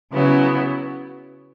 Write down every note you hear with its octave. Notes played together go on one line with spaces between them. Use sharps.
C#3 F#3 B3 E4